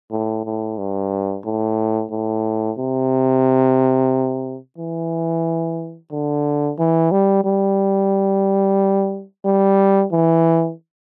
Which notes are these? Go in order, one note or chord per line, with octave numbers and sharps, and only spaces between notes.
A2
A2
G2
A2
A2
C3
E3
D3
E3
G3
G3
G3
E3